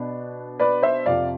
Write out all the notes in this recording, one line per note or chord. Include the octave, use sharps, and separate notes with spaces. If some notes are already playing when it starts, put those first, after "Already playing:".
Already playing: B2 B3 D4
B4 D5
C5 E5
F2 C3 F3 D5 F5